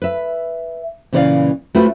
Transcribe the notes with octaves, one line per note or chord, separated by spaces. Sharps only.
B4 E5
A#2 C#3 E3 C#5 D5 F5
A3 C4 F4 F#4 B4